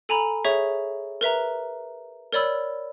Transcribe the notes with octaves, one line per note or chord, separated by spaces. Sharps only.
A4 G#5 A#5 B5
G#4 C#5 E5 C#6
A#4 B4 E5 A#5
A#4 C#5 D5 B5 E6